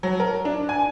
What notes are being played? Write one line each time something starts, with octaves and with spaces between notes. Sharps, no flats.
F#3
A#4
D4
G#5